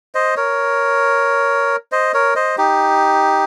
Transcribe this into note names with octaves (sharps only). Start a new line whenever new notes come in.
C5 D#5
A#4 C#5
C5 D#5
A#4 C#5
C5 D#5
D#4 G4